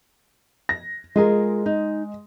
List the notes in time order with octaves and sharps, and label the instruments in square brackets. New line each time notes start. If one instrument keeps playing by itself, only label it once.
[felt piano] A#6
[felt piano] G#3 [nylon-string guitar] F4 G#4 A#4
[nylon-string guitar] D#4